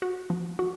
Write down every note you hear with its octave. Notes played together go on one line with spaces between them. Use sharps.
F#4
F3
F#4